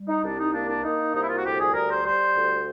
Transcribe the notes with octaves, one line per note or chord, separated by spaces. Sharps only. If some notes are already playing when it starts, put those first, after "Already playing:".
Already playing: G3
D#4
C2 D4
D#4
A#3 D4
D4
A#3 D#4
C2 D#4
E4
F4
F#4
D2 G4
G#4
G3 A#4
C5
G3 C5
D2